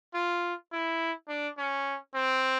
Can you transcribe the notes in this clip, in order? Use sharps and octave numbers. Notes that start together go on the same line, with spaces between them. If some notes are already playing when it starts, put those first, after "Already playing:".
F4
E4
D4
C#4
C4